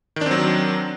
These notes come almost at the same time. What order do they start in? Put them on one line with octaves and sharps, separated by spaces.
D#3 D4 C4 F#3